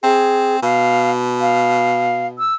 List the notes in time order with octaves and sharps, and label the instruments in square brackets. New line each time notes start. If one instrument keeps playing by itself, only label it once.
[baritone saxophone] C4 [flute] G#4
[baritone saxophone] B2 [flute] F5
[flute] F5
E6